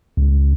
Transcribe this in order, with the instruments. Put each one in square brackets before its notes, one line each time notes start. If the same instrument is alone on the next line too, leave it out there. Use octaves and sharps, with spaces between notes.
[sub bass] C#2